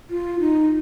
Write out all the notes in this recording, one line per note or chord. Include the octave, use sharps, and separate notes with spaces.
F4
D#4